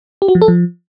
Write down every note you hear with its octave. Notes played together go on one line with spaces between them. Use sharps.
G4
F#4
F3
A4
F3